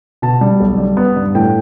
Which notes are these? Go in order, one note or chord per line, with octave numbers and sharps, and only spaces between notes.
B2 A5
G3
B1
G3
B3
G2
A2 G5